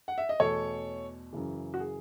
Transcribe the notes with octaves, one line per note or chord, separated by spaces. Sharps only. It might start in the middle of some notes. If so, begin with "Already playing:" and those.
F#5
E5
D#5
E2 B2 A3 A4 C#5
F#2 C#3 E3
F#4
G#4